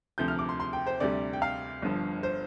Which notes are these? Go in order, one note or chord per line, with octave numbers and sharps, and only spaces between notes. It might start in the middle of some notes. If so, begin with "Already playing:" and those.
D2 C3 F3 G6
F6
D6
C6
C6
G5
C5
D2 C3 G3 D5
G5
F5
G1 G2 F3
C5